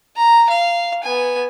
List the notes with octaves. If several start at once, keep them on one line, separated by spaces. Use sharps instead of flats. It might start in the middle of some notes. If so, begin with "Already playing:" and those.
A#5
F5
B3 G#5